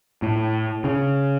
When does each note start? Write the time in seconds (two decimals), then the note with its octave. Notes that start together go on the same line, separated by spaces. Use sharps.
0.22 A2
0.84 C#3